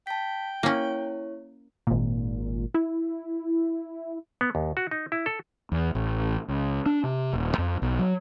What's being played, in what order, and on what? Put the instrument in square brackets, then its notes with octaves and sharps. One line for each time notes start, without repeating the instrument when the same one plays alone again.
[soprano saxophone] G5 [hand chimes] A5 B6
[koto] A#3 C#4 [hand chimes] E4 C#5
[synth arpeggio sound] G#1 A#2
E4
[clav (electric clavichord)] B3
D#2
F#4
D#4
E4
A4
[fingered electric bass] E2
A1
C#2
D4
C3
D#1
F2
B1
F#3